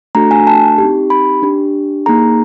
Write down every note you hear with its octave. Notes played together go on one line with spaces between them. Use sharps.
A3 D4 F#4 A4 A#5
G#5
A5
C4 D#4 G4
B5
D4 G4
A#3 D#4 G#4 A#5